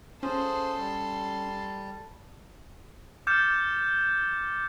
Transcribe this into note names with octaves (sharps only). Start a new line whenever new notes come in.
C#4 F4 G#4 A4 C5 C6
G3
D6 F6 G6 A6 C#7 E7